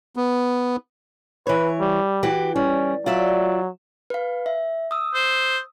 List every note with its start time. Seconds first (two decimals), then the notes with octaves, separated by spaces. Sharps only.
0.16 B3
1.47 E3 B4 C#5
1.80 G3
2.23 E3 F#4 G4
2.56 G3 C#4
3.06 F#3 F4 D5 E5
4.10 B4 F5
4.46 E5
4.91 D#6 E6
5.14 C5